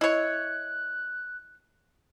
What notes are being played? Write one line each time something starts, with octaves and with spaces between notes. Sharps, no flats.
E4 C#5 D#5 F#6